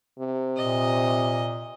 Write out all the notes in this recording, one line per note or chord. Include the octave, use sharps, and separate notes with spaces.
C3
A#2 D#5